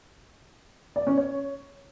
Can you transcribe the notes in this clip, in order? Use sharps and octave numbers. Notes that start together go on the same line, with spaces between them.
D5
C#4
C#5